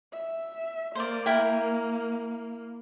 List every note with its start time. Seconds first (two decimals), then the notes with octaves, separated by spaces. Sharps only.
0.13 E5
0.95 A#3 C5 D5
1.26 E4 A#4 G5